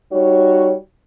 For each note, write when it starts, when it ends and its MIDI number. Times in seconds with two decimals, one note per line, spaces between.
0.11 0.74 55
0.11 0.74 63
0.11 0.74 66
0.11 0.74 73